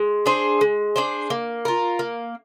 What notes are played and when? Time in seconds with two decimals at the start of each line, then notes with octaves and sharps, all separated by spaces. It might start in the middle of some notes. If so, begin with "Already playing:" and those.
Already playing: G#3
0.26 D4 G#4 C5
0.61 G#3
0.96 D4 G#4 C5
1.30 A#3
1.65 F4 A#4
1.99 A#3